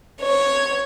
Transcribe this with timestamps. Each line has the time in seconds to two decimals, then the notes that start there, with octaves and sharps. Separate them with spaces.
0.22 C#5